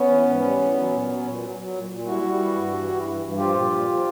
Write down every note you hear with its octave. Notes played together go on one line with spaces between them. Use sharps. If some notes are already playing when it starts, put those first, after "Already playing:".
Already playing: B3 C#4
E3
G#2
G3
E3
F#3
A#2
F#3
A#2
F#3
F#3
A#2
A#2
G3 E4 F#4
G3
E3
G2
G3
E3
G2
G2
F3 F4 G4
A#2
A#2
F3